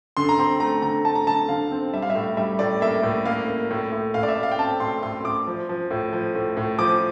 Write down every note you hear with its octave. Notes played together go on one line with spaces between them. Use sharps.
D3 C6
A#5
C4 C6
A3 A#5
D3 A#5
A3 A5
A#5
D3 A5
D3 F5
C4
G3 E5
F5
E5
A2
G3 E5
A2 D5
A#3 E5
A2
A#3 F5
A#3
A2
A2
A2 F5
D5
E5
A2
F5
G5
C4 A5
A2 C6
A2 C6
A2 D6
F3
F3
A2
F3
A2
A2
F3 D6